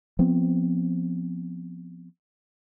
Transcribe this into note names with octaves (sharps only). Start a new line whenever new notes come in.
F3 B3 C4